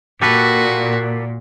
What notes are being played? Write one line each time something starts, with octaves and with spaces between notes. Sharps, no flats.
A#2 F#4 G4 A4 B4